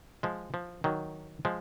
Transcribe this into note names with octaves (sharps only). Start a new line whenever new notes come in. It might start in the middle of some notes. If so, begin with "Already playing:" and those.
F3 G#3
F3
D#3 F#3
F3 G#3